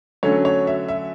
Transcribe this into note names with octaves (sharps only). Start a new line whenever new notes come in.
D3 F#3 A3 C#4 C#5
C#5
E5
E5